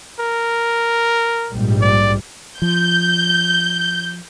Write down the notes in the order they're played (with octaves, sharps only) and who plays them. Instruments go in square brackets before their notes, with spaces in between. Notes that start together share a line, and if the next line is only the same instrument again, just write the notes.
[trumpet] A#4
[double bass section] A#1 G#2 G3
[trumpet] D5
[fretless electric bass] F3 [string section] G6